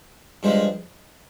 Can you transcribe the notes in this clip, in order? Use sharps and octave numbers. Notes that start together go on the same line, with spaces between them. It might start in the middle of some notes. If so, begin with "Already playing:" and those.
G2 F3 G#3